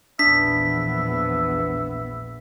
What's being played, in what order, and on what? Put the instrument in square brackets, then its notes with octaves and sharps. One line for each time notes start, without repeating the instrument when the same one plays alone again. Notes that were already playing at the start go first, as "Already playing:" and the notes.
[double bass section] A#1 E2 B3 [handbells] D4 [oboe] E5 [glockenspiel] B6